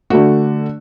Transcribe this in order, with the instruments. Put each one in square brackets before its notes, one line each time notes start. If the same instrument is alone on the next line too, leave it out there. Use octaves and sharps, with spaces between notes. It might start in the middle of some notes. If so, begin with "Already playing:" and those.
[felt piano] D3 A3 F#4